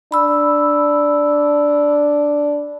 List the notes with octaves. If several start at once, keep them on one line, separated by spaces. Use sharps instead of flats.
D4 B5 E6